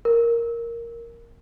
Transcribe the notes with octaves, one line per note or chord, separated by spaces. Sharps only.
A#4